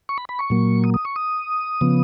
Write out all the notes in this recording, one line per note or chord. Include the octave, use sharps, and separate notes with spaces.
C#6
B5
B5
C#6
A#2 F#3 A#3
D#6
D#6
C#6
D#6
C#3 F3 B3